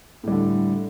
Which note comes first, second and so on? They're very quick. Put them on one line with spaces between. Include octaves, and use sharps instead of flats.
A2 G3 D3